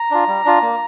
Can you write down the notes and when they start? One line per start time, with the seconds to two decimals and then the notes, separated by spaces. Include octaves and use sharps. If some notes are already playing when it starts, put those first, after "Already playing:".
Already playing: A#5
0.11 D4 F4
0.28 G3
0.45 D4 F4
0.62 A#3